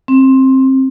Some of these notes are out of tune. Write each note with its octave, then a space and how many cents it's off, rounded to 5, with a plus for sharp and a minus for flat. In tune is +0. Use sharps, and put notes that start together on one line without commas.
C4 +15